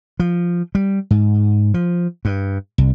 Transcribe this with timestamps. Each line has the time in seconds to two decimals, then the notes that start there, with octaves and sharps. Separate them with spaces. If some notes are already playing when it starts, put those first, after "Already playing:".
0.20 F3
0.75 G3
1.11 G#2
1.74 F3
2.25 G2
2.78 C2